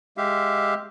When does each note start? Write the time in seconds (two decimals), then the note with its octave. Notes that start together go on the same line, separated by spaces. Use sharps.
0.17 G#3 G4 E5 F5